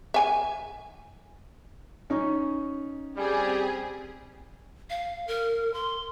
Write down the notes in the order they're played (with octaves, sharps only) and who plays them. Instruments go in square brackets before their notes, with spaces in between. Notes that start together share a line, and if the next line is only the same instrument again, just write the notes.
[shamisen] E5 G#5
[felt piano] C#4 D#4
[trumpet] G3 [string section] C4 G4 G#4
[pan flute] F5
A#4
C6